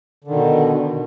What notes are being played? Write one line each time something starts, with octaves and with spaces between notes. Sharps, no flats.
B2 D3 D#3